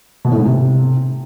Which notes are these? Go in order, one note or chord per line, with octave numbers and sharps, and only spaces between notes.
B2
A2
G#2
C3